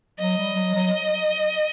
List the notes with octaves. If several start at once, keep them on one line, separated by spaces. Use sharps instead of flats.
F#3 D#5
G3
F#3
F#3